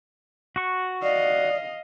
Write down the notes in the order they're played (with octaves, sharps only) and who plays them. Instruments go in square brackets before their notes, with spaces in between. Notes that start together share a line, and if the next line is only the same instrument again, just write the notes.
[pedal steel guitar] F#4 C#6
[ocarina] D5 [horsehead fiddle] D#5 F5